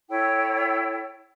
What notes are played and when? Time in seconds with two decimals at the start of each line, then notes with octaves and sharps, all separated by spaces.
0.09 E4 A4 C#5 G5